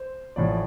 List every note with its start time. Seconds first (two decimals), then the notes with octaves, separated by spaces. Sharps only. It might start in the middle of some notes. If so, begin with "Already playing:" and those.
Already playing: C5
0.36 A1 A2 F3 D5